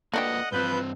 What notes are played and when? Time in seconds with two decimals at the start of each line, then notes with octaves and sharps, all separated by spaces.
0.13 A3 A#3 D4 F4 B4 D#5 F#5 G5
0.52 G2 F3 C4 B4 G6